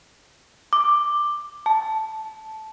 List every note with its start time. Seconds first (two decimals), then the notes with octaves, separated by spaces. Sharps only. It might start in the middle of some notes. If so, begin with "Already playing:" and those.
0.73 D6
1.66 A5